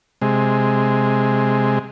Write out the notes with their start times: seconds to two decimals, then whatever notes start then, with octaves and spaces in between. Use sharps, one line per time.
0.22 C3 G#3